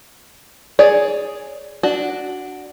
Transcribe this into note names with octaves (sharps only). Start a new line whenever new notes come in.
G#4 C#5 D5
D4 F#4